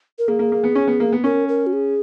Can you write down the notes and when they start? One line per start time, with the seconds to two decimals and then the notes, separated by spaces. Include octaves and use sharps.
0.19 A#4
0.28 A#3 G#4
0.39 A#3
0.52 A#3
0.64 B3
0.75 C#4
0.87 B3
1.00 A#3
1.12 B3
1.24 C#4 A#4
1.49 A#4
1.67 F#4
1.73 G#4